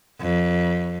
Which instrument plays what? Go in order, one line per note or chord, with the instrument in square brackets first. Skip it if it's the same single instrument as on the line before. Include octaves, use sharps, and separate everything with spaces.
[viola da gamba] F2